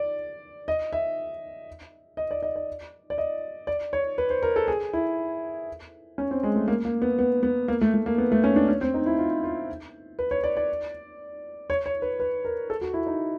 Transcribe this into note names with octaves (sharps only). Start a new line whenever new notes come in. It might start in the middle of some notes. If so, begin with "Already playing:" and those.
Already playing: D5
D#5
E5
D#5
D5
D#5
D5
D5
D#5
D5
C#5
B4
C5
A#4
A4
G#4
E4
C#4
C4
G#3
A3
A#3
A#3
B3
B3
B3
A#3
A3
A3
A#3
B3
A3
C#4
D4
C#4
C4
D#4
E4
F4
F4
B4
C#5
D5
D5
C#5
C#5
B4
B4
A#4
A4
F#4
E4
D#4